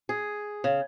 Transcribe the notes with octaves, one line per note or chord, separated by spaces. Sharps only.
G#4
C#3